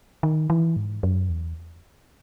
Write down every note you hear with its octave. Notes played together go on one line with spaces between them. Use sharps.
D#3
E3
G#2
F#2
E2